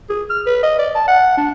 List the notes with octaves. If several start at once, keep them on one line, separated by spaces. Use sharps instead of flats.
G#4
F6
B4
D#5
D5
A5
F#5
D4